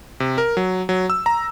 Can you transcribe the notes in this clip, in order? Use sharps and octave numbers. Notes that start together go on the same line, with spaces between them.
C3
A#4
F#3
F#3
E6
A#5